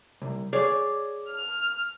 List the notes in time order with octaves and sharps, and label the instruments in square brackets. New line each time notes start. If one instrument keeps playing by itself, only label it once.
[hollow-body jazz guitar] C2
G#4 C#5 D5
[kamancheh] F6